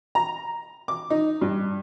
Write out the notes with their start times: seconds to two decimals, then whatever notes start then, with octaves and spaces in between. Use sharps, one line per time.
0.15 A#5
0.88 D6
1.10 D#4
1.41 G2